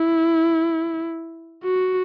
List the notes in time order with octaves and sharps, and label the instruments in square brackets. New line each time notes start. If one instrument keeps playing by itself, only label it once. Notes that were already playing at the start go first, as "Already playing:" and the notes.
Already playing: [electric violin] E4
F#4